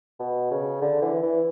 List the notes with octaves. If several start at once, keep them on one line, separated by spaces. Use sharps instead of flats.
B2
C#3
D3
E3
E3